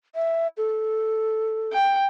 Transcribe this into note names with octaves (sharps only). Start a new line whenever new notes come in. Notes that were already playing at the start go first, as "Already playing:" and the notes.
E5
A4
G5